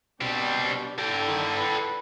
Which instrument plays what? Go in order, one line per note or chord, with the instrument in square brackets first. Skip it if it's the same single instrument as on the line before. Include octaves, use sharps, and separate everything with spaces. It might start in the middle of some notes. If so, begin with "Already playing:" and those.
[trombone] B2 [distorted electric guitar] G3 C4 [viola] D4 G4
[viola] D3 E4 [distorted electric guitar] A4 G5
[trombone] D#3
B4